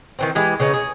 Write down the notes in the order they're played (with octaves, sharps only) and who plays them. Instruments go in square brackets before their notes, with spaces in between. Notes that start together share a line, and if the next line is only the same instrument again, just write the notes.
[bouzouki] D#3 E3 C4
E3 G#3 G4
C#3 B3 C#4 D#4
G#4